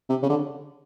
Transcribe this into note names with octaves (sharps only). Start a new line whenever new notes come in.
C3
C#3
D3